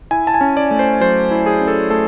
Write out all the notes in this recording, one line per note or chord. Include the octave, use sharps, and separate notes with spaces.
E4 G#5
A5
G#5
C#4
D5
A3
C5
F#3 C5
E4
G#4
C#4
A4
A3 A4